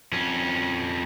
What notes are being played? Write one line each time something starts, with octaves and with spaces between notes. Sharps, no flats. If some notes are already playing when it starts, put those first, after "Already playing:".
F2 C#4